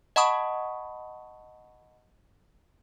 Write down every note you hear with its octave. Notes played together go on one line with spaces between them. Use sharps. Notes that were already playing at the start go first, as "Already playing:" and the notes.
D#5 F#5 A5 B5 C#6 D#6